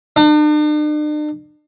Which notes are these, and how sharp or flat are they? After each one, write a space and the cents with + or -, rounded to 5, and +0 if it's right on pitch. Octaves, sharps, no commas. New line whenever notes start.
D4 +45